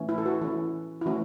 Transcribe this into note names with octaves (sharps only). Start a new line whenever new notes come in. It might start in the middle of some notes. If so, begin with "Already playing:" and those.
Already playing: E3 A3 C#4
E4
A4
F#4 B4
E3 C#4 E4
E4
E3 A3 C#4 F#4